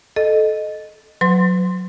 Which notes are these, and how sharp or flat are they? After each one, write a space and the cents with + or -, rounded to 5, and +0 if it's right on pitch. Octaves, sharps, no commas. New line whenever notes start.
A4 -20 D#5 -10
F#3 -15 B4 +35 C6 +0